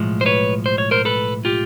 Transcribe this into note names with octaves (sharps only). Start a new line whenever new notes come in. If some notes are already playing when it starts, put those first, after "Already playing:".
Already playing: B1 A2 F3 G#3
C5
B4 C#5
C5
C#5
A#4 C5
A4 B4
F4 G4